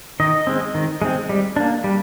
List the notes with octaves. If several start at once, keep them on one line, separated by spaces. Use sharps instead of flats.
D#3 D#5
G#3 C4
D#3
G#3 C4
G3
A#3 D4
G3